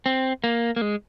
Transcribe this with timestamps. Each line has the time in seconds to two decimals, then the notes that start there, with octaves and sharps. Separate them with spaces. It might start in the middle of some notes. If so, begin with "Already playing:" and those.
0.06 C4
0.44 A#3
0.76 A#3
0.82 G#3